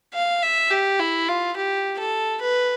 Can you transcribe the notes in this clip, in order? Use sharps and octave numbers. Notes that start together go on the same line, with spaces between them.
F5
E5
G4
E4
F4
G4
A4
B4